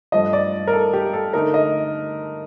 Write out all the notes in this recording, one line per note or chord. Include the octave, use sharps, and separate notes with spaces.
G2 F3 A3 D#5
D5
A#4
A4
G4
A4
D3 A3 D#4 A#4
D#5